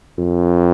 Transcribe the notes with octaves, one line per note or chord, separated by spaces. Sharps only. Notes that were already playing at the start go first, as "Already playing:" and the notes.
F2